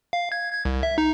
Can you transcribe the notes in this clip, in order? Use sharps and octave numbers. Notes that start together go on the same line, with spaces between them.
F5
G#6
G#6
C2
E5
D#4